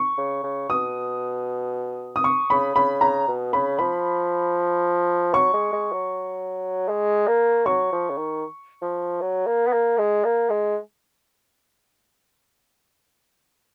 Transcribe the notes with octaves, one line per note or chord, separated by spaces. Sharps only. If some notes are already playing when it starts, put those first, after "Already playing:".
Already playing: C#6
C#3
C#3
B2 D#6
D#6
C#6
C#3 B5
C#3 B5
C#3 A#5
B2
C#3 B5
F3 B5
F#3 C#6
G#3
G#3
F#3
G#3
A#3
F#3 C#6
F3
C#3
D#3
F3
F#3
A#3
B3
A#3
G#3
A#3
G#3